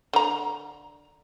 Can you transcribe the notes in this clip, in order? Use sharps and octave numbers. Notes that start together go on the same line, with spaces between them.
D3 A#5